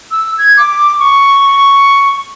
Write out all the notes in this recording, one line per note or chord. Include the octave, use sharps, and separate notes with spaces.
E6
G#6
D6
C#6